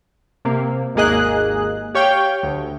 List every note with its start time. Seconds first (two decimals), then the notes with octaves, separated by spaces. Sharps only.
0.45 C3 A#3
0.95 G#1 D#2 A#3 G#4 D#5 F#6
1.95 G4 C#5 F5 G5
2.43 D2